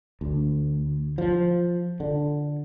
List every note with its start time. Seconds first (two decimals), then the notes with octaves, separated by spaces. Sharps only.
0.21 D2
1.18 F3
2.00 D3